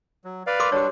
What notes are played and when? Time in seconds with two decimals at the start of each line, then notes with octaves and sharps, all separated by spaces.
0.25 F#3
0.47 B4 D5 F5
0.60 A#4 C6 D6
0.72 G3 D4 G4 C#5